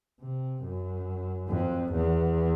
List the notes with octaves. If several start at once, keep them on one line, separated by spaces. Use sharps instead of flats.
C3
F#2
F2
E2